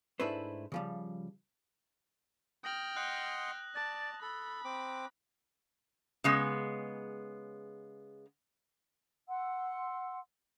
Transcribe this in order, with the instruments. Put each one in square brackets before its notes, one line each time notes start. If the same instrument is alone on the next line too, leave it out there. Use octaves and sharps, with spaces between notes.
[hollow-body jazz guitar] G#2 A3 D4 E4 B4 C5
C#3 F3 G3
[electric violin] G5 F6 [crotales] D#6 A#6 F#7
[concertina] D#5 F#5 C6 [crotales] F#6
[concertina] D5 [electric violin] A5
[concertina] A4 [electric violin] B5
[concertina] C4 D6
[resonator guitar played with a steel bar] C#3 G#3 B3
[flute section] F#5 C6 E6